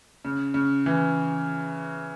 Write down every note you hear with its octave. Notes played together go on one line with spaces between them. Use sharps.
C#3
C#3
E3